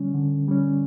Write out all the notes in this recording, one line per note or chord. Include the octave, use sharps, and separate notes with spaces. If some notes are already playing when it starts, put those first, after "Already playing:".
Already playing: D3 G3 C#4
D3
G3 C#4